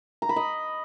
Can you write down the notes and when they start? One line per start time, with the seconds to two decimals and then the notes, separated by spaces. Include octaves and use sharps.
0.22 A#5
0.29 B5
0.36 D#5